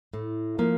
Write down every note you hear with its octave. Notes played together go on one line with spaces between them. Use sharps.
A2
F3 A#3